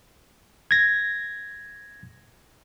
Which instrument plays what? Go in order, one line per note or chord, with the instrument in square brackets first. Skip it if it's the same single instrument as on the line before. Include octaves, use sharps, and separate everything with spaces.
[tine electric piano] G#6 A#6